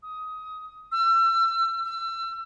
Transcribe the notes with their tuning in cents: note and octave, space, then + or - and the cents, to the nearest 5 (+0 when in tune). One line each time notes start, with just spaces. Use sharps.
D#6 +20
E6 +35
E6 +35